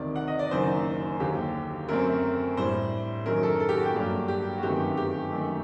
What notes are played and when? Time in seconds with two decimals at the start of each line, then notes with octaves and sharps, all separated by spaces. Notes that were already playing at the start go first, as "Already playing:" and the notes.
Already playing: D2 C3 D#3 D5
0.16 F#5
0.28 D#5
0.39 D5
0.51 F#1 F#2 D#3 C5
1.20 D#2 D3 F#3 G4
1.88 F#2 F#3 A3 C4 A#4
2.57 A2 G3 D4 C5
3.26 F#2 D#3 F#3 A#4
3.43 A4
3.60 A4
3.69 G4
3.77 F#4
3.86 G4
3.94 G2 F#3 A#3 D4
4.28 G4
4.58 F#4
4.62 G1 F#2 D#3 A3 C4 G4
4.97 G4
5.32 F#2 D#3 A3